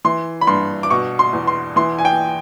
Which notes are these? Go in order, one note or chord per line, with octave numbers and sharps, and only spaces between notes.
E3 C6
B5
G2 C6
D6
B2 C#6
C6
E2
C6
E3 C6
G#5
G5